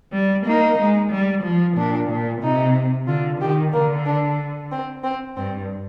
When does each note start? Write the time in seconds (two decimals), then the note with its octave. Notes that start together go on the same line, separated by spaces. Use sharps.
0.13 G3
0.46 A#3 D#4
0.79 G#3
1.12 G3
1.44 F3
1.77 A#2 D4
2.09 A#2
2.42 C3 D#4
3.07 D3 F4
3.41 D#3 G4
3.73 D3 A#3
4.06 D4
4.72 C4
5.04 C4
5.37 G2 C4